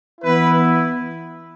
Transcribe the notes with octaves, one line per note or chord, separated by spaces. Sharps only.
E3 B3 E4 B4